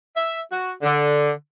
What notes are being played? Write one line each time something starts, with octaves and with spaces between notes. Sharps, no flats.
E5
F#4
D3